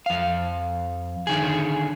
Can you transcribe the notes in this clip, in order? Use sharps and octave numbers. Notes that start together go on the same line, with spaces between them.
F2 F5
D3 D#3 G#4